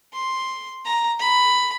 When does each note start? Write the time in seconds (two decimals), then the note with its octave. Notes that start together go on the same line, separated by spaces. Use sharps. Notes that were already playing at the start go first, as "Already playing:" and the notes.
0.13 C6
0.85 A#5
1.19 B5